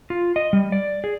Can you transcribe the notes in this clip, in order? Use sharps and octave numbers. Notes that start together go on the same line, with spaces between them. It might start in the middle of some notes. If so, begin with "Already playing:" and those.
F4
D#5
G3
D5
G#4